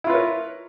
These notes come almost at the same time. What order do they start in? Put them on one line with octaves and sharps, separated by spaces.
E4 F4 B4 C#5 A#4